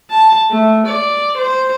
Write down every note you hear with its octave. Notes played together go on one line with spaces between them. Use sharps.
A5
A3
D5
C5